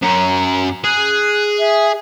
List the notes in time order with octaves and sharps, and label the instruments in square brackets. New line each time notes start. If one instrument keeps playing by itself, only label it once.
[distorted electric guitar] F#2 C#4 [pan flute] A#5
[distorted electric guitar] G#4 [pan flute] F#6
[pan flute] E5